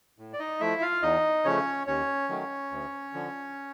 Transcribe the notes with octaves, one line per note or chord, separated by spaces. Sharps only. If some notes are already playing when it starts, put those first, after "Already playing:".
A2
D5
D#4 D#5
F3 A3 E4 E5
F4 F5
E2 D#4 D#5
C#3 F3 A3 C#4 C#5
D#2 C#4 C#5
D#3 F#3 A3
D2
D3 F3